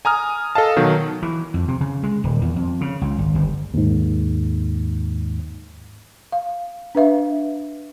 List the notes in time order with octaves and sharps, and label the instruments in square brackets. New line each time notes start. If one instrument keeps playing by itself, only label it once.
[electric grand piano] G#5 A#5 D#6 F6
A4 D#5 F5 A5
B2 D#3 F#3
[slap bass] E3
F2
C3
C#3
G#3
D#1
E2
F2
C#3
C#2
G#1
G1
[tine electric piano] D#2 G#2
[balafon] F5
D4 B4 E5 F5